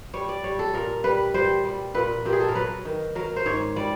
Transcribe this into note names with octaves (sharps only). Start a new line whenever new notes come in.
G3 C#5
D5
G3 C#5
A4
A#2 A#4
G3 B4
G3 C5
G3
A#2 B4
A#2 G4
G#4
A4
A#4
F#3 B4
D#3
F#3 A#4
C5
G#2 C#5
G3 D5